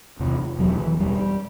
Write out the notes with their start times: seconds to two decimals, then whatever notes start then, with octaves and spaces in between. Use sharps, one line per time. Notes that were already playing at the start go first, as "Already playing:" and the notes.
0.20 E2 C3
0.59 E2 B2 F#3
0.79 E3
0.99 E2 B2 G3